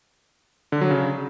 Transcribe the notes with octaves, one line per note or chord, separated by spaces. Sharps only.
D3
F#3
C#3